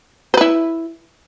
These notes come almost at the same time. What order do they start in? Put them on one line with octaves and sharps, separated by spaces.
C5 B4 E4